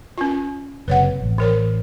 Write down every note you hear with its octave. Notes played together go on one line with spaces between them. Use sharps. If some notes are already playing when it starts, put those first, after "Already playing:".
C#4 F4
F#1 C3 B4 C#5 F#5
A1
E3 A#4 C#5